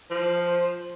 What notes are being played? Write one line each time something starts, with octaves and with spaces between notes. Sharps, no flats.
F3 C5